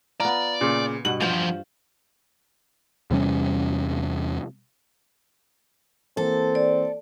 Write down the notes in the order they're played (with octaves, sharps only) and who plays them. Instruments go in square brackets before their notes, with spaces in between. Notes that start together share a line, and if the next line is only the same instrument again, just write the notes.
[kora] B3 F4 [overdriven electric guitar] D5 [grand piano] A#5
[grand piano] A#2 C#3
[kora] G2 B2 F#5 [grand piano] F#7
[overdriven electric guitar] E2 F3 [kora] F4 C5
[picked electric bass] E2 C3 G3 C#4
[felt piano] E3 A#3 [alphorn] C4 [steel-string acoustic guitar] A4
[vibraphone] D5